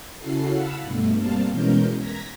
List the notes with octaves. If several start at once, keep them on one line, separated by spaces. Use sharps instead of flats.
C#3 C#4 E4 F#4 A4 C7
F5 F#5 A5 B5 E6
G2 B2 A3
G3 A#3 C4 F5 A5
B2 E3 G#3 C#4 A#4 G6
A#5 G#6 A#6 B6